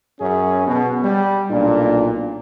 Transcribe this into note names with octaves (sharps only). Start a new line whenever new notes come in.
F#2 C#4 G#4
B2
G3
B1 A#2 D4